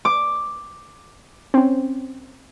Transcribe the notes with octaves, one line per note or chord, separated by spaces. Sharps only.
D6
C4 C#4